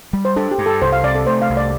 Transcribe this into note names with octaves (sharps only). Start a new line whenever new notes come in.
G3
C5
D4 A4
G4
G2
A4
C2 C5
F5
C3 D5
A4
A3 C5
F5
C2
D5